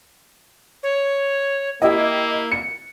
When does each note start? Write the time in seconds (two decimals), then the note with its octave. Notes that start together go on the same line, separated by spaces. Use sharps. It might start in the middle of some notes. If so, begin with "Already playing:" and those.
0.83 C#5
1.82 A#3 E4 G4 D#5
2.52 C#7